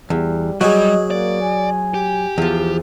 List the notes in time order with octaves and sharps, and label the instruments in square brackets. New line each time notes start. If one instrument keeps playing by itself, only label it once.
[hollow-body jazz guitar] E2 [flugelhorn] G3
[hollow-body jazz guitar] F#3 [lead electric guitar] G3 [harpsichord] F#4 G#4 [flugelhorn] D#5
[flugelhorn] A#3 [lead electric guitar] D5
[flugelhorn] G#5
[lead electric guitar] G4
[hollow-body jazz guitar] E2 F3